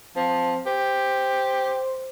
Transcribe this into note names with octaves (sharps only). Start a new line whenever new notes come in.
F3 C4
G4 C5